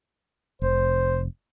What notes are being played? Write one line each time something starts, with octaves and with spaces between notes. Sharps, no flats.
F1 C5